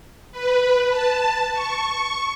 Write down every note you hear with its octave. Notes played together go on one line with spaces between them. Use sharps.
B4
A5
C#6